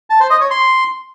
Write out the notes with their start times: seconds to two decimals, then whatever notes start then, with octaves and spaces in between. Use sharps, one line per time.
0.10 A5
0.20 C5
0.30 D#5
0.40 C#5
0.51 C6